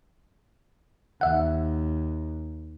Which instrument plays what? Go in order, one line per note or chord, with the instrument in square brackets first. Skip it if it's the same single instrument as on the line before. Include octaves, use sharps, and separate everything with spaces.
[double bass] D#2 [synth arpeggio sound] E5 F#5